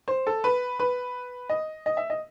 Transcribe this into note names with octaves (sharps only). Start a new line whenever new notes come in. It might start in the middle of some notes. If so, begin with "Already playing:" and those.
C5
A4
B4
B4
D#5
D#5
E5
D#5